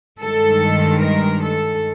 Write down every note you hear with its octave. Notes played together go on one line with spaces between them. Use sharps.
G2 D#3 G#3 A4
A#4
A4